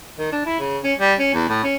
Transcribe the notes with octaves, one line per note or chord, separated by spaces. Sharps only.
D#3
D4
E4
C#3
C#4
G3
C#4
E2
A2
C#4